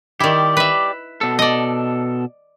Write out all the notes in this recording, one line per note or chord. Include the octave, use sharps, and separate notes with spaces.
D#3 E4 G4 D5
B4 E5
B2 A4
D5 D#5